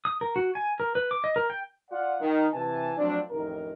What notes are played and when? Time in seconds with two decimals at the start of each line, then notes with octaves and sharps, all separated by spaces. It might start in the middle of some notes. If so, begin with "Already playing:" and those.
0.05 D#6
0.21 A#4
0.36 F#4
0.55 G#5
0.80 A#4
0.95 B4
1.11 D6
1.24 D#5
1.36 A#4
1.50 G5
1.91 F4 D5 F#5
2.20 D#3
2.53 C3 E3 G#5 A5
2.97 F3 F#3 A3 C4 D4
3.30 A1 F2 D#3 A#4